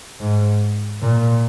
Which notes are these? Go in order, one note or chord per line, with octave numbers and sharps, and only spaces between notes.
G#2
A#2